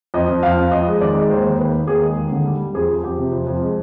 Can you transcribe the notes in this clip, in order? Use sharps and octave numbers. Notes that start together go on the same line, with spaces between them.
F2 D#5
F2
F2 F5
F2
F2 D#5
G#3
D#3 D5
G#3
D#2 C5
D#2
D#2 B4
D#2
D#2 G#4
G#3
D#2
D3
G3
G3
F2 G#4
F2
F2 G4
C3
F2
F2
G#3